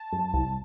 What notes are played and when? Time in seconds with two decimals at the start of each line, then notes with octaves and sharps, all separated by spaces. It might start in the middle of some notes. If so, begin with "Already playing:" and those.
Already playing: A5
0.13 F#2
0.34 C2